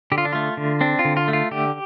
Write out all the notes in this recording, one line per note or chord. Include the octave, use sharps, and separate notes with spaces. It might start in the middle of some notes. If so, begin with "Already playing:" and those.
D3 G4
F4
D4
A3 F4
D3
C4 D4
F4
D3
F4
A3
F4
D3 G4